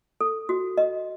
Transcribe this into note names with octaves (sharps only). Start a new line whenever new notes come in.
A4
F#4
D#5